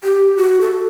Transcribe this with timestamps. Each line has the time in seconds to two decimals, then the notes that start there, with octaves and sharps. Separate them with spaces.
0.04 G4
0.37 F#4
0.61 A4